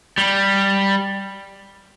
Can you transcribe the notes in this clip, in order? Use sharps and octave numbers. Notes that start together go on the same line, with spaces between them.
G3